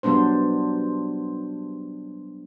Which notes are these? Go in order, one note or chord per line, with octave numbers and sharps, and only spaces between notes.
F#3 G3 B3 D4 C5